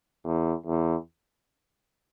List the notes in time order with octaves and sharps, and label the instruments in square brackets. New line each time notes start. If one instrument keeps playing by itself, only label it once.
[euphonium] E2
E2